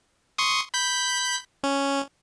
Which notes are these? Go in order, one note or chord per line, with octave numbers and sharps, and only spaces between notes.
C6 C#6 D#6
B5 G6 B6
C#4